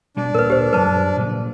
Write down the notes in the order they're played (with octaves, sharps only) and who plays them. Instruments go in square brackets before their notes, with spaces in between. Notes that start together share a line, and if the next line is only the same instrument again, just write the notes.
[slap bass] B2 G3 [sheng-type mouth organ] D4
[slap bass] D2 A#2 [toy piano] A#4 B4
[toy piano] G4 C5
[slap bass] F#2 F#3 G3 [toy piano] B4 A5
[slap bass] A#2 C#3 F3